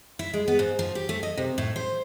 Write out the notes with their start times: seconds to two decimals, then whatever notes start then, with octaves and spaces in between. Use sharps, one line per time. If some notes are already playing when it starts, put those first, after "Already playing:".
0.19 E4
0.33 G#3
0.48 B3
0.59 G#2
0.79 F3
0.95 G4
1.09 A3
1.23 D#5
1.37 C3
1.58 A2
1.76 C5